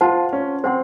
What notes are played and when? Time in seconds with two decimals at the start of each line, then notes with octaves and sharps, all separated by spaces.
0.01 F4 C5 F#5 A5
0.33 C#4
0.64 C4 C5 F#5 C6